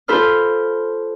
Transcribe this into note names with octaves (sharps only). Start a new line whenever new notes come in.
F4 A4 C5 B5 F6